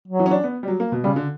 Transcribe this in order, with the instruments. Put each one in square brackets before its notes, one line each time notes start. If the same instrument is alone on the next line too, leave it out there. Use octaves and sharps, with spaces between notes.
[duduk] F#3
[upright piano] E3
C#4
D4
B3
G3
F#3
A#3
B2
[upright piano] C#3 [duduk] G3
[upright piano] D3